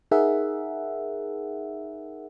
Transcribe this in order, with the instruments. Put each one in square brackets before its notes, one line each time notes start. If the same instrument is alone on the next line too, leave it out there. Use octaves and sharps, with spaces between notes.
[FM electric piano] D#4 G#4 A#4 E5 F#5